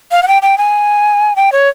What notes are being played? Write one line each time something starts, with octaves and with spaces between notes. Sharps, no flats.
F5
F#5
G5
G5
G#5
G5
C#5